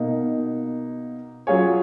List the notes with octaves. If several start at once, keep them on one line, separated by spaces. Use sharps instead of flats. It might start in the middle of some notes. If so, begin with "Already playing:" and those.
Already playing: B2 A#3 D#4
F#3 C#4 F4 G#4 C#5